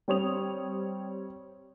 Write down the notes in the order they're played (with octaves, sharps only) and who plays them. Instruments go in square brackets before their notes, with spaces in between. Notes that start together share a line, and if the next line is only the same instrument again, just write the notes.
[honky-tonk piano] G3 C4 C#5 D#6 F7